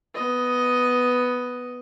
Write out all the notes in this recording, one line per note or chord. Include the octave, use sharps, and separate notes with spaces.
B3 D#5